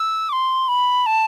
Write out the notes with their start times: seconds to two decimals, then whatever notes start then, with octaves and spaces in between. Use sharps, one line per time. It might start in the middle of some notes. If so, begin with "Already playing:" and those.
Already playing: E6
0.29 D6
0.32 C6
0.68 B5
1.06 A5